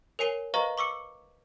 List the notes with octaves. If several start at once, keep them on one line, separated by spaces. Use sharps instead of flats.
A#4 C#5 G#5 C7 D#7 G7
B4 C5 D#5 F5 A#5 C#6
C#6 D6 E6 C#7